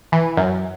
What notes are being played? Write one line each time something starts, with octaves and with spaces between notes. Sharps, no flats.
E3
F#2